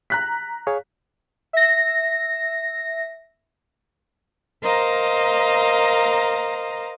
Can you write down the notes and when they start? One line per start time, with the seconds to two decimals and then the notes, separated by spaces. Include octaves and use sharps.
0.10 A#5 F#6 B6
0.67 G#4 C#5 F5
1.53 E5 A#6
4.62 A#4 C5 D#5 F5 A#5